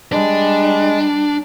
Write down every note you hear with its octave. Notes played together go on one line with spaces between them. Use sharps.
G3 G#3 D4